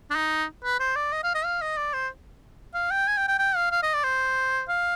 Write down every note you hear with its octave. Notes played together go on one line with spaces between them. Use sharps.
D4
D#4
B4
C5
D5
D#5
F5
D#5
F5
D#5
D5
C5
F5
G5
G#5
G5
G5
G5
F5
F5
D#5
D5
C5
F5